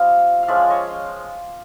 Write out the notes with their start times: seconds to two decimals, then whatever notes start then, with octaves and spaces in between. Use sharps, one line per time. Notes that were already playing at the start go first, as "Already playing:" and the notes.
Already playing: G3 C4 F4 D#5 F5
0.43 F5
0.48 F3 G#3 C#4 F4 D5 E5
0.70 C#5 D#5